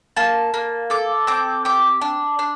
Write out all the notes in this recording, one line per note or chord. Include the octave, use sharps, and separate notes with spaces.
A#3 A5
A#3
A4 D6
C4 D6
G4 D6
D4
D4